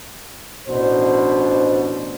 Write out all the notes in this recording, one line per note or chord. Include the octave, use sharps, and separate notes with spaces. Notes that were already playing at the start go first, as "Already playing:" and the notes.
A1 B2 D4 C5